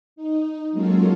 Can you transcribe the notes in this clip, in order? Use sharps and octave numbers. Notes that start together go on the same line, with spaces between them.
D#4
F#3 G#3 A#3 C#4 F4 A4